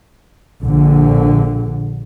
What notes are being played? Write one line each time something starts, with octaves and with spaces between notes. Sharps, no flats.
A#1 D3